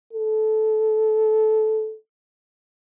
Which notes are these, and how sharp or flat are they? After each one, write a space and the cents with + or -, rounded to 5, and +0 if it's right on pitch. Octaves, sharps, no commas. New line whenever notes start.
A4 -15